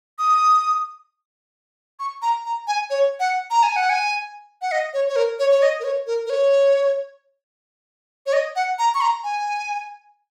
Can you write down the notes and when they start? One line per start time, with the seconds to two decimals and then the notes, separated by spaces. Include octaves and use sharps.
0.19 D#6
1.99 C#6
2.22 A#5
2.46 A#5
2.68 G#5
2.90 C#5
3.20 F#5
3.51 A#5
3.63 G#5
3.76 F#5
3.90 G#5
4.62 F#5
4.72 D#5
4.94 C#5
5.09 C#5
5.16 A#4
5.39 C#5
5.51 C#5
5.62 D#5
5.80 A#4
5.84 C#5
6.07 A#4
6.26 A#4
6.30 C#5
8.26 C#5
8.33 D#5
8.56 F#5
8.79 A#5
8.94 C#6
9.01 A#5
9.24 G#5